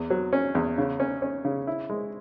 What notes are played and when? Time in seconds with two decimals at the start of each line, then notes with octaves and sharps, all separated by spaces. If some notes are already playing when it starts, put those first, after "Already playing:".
Already playing: E2
0.10 F#3
0.33 C#4
0.55 E2
0.78 C#3
1.00 C#4
1.22 C#4
1.45 C#3
1.67 E4
1.90 G#3